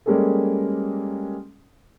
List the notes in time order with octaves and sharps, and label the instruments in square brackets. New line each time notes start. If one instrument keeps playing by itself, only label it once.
[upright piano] G3 G#3 A#3 C#4 G#4 A4